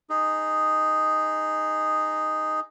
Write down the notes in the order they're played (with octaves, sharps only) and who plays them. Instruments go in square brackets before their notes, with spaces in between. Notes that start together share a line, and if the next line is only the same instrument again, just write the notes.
[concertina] D#4 G#4